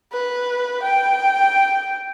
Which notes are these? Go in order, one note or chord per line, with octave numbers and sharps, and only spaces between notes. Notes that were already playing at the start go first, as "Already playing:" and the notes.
B4
G5